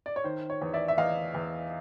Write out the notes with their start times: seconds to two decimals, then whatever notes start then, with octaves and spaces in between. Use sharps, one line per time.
0.06 D5
0.16 C#5
0.24 D#3 C5
0.50 C#5
0.62 E2
0.73 D5 E5
0.88 E5
0.98 E2 D#5 F5
1.34 E2